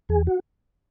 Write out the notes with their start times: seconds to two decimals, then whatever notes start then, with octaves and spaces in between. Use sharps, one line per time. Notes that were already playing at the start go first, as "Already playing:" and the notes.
0.09 E2 G#4
0.27 F#4